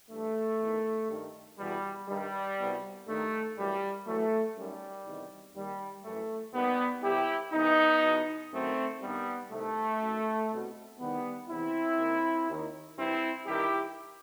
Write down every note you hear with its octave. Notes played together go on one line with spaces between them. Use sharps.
G2 E3 A3
E2 D#3
G2 D#3
E2 B2 G3
G2 D#3 G3
C2 B2
G2 D#3 A3
F#2 E3 G3
F#2 E3 A3
F#2 D#3 G3
E2 C3 D#3
D#2 D#3 G3
F#2 E3 A3
D#2 D#3 G3 B3
C2 C3 E3 E4 G4
C2 C3 E3 B3 D#4
E2 B2
F#2 D#3 A3 C4
G2 D#3 G3 B3
C2 C3 D#3 A3
F#2 D#3
C2 B2
E2 C3 D#3 G3 B3
E2 C3 E3 C4 E4
D#2 D#3
D#2 D#3
G2 E3 C4 E4
G2 D#3 E4 G4